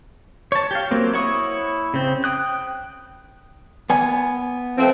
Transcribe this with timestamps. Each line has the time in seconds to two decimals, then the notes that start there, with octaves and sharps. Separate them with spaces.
0.52 C#5 A5
0.71 G4 F5
0.91 F#3 A#3 C4
1.13 E4 C#5 F#5 C#6 D#6
1.94 C#3 C4
2.24 G5 D#6 F#6
3.90 B3 G#5
4.78 F3 A3 C4